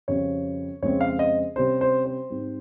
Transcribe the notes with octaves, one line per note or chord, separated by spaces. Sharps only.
F2 C#3 G3 C4 C#5
F2 C#3 G#3 C4 C#5
F5
D#5
C3 G3 C#4 C5
C5
C5
G#2 G3 C4